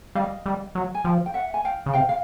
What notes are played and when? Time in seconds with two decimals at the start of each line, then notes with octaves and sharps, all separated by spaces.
0.15 G3 D#5 F5
0.46 G3
0.75 F#3
0.95 G#5
1.05 F3 F5 G5
1.26 G5
1.34 E5 F#5
1.54 G#5
1.65 F5 G5
1.86 C#3
1.93 C3 F5 G5
2.09 F5